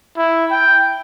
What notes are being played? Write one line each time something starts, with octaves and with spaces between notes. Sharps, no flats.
E4
G5